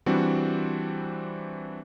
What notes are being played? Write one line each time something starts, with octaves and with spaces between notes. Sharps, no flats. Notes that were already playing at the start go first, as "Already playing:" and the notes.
E3 G3 C4 D4 F#4